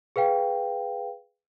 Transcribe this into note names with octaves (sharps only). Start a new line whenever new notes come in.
G#4 B4 F5 G5